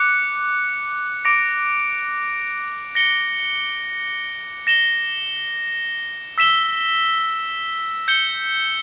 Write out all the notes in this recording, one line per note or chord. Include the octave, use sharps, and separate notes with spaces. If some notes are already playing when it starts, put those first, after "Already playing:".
Already playing: D6 F#6 C#7
D6 A#6 D7
A#6 C#7 G7
A#6 E7 G7
E6 B6 E7 G7
G6 C#7 G7